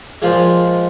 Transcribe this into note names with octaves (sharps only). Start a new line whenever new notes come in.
A#2 F3 G#3 F4